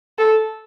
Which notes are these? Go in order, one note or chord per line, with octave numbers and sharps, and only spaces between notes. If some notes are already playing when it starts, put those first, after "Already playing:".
A4